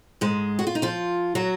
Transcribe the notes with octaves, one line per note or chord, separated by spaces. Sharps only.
G#2 G#3
F#4
F4
D#4
F3 F4
F#3 F#4